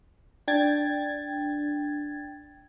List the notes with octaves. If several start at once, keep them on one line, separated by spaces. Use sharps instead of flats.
D4 G5 G#6 A6